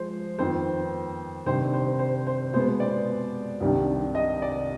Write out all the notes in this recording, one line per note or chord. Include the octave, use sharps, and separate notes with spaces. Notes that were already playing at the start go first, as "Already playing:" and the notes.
Already playing: F3 G#3 C5
F2 D#3 B3 C5
C3 D#3 G3 D4 C5
C5
C5
C5
B2 G#3 B3 C5
D5
C2 C3 D#3 G3 D4
D#5
D5